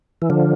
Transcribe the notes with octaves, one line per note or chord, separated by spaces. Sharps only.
E3
D3 F3